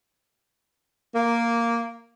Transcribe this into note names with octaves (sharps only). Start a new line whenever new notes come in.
A#3